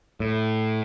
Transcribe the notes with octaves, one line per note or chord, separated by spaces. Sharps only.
A2